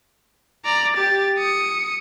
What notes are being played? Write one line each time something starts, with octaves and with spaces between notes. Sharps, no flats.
D5 A#5
G4 A6
D#6 C#7